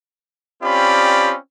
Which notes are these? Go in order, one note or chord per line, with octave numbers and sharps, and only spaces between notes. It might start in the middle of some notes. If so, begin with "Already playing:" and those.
C4 C#4 F4 G4 D5 B5